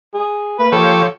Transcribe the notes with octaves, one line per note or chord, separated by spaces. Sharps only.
G#4
A#3 B4
F3 G4 A4 C#5